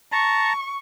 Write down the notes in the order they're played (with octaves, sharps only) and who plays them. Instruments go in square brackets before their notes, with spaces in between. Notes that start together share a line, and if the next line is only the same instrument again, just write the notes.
[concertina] A5 A#5 [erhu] C#6